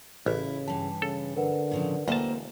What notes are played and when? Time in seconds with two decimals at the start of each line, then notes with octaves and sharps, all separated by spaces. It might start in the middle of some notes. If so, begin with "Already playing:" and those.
0.26 A1 C#3 E4
0.68 G2 E3 A5
1.02 C#3 A4
1.36 D3 A#4 B4 F#5
1.71 A2 C#3 F3
2.08 E1 D2 A#3 C4 C5 A5